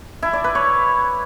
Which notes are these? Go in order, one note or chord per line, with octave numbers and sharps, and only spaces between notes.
E4
D5
B4
C#5